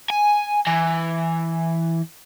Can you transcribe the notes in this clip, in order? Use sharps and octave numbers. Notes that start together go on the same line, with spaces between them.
G#5
E3